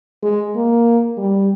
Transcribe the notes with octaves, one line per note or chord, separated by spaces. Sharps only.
G#3
A#3
G3